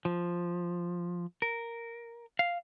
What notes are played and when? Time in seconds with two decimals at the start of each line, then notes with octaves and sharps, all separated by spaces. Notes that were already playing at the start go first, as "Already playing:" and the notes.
0.05 F3
1.42 A#4
2.39 F5